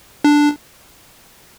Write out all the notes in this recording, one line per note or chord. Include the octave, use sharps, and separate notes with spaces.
D4